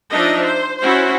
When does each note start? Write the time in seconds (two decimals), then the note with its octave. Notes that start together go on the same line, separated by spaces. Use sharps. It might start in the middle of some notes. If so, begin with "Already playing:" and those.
0.10 F3 D4 D#4 D#5 E5
0.43 C5
0.80 C#4 E4 F#4 C5